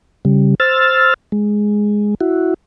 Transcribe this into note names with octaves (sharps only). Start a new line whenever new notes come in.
C#3 G3
C5 E6 F6 A6
G#3
E4 F#4